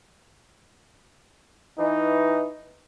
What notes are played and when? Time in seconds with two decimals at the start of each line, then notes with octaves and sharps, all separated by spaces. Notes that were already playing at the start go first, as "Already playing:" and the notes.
1.78 E3 D#4